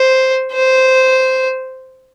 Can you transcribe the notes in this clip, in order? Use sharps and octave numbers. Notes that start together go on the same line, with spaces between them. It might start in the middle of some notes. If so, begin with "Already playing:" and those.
Already playing: C5
C5